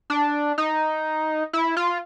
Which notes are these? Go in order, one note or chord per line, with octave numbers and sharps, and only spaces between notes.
D4
D#4
E4
F4